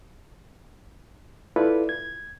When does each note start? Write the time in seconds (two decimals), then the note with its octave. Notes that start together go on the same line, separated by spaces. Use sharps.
1.56 E4 F4 A4 B4 D5
1.89 G#6